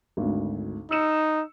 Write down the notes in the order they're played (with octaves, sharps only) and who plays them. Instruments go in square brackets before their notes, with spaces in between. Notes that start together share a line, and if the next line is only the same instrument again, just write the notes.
[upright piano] G#1 D2
[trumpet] D#4 [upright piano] E6 C#7 E7